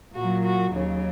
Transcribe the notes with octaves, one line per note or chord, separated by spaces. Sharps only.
A#2 F#3 F#4
F#4
D#2 C#3 F#3